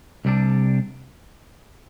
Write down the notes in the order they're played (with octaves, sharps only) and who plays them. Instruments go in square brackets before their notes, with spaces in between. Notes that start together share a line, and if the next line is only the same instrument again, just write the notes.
[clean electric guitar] C2 C3 G3 D4